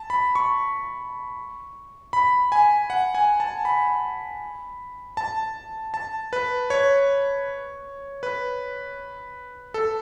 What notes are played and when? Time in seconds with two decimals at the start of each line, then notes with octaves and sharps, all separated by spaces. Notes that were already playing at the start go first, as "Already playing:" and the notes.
Already playing: A5
0.10 B5
0.35 C#6
2.13 B5
2.52 G#5
2.90 F#5
3.15 G#5
3.40 A5
3.65 B5
5.17 A5
5.94 A5
6.33 B4
6.70 C#5
8.23 B4
9.74 A4